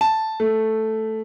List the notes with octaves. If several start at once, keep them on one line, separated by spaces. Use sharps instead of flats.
A5
A3